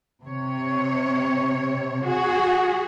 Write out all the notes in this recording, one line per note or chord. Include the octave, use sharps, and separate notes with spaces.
C3 C#5
F#4 G#4